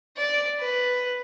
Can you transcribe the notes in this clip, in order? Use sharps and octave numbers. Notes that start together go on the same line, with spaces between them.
D5
B4